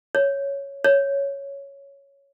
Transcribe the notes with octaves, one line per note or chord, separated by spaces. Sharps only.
C#5
C#5